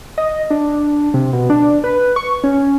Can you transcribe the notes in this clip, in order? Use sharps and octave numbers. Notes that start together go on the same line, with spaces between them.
D#5
D4
C3
B2
D4
B4
C#6
C#4